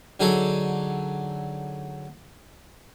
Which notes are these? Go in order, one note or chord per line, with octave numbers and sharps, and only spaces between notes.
D3 F#3 D#4 G#4 A4